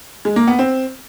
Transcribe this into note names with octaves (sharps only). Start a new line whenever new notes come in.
G#3
A#3
B3
C4